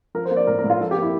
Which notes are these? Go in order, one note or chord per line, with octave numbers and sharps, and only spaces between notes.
F3 A#4
C5
A#3
D5
A2 A#4
A#4
A2
F4
F3 A4
G4
A#3
E4